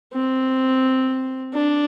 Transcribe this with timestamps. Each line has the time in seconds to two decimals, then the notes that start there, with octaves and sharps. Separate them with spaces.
0.13 C4
1.54 D4